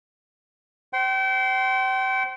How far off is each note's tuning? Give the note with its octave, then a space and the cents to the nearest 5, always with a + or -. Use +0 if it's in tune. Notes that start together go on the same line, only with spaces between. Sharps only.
C5 +0 G5 -35 C6 +0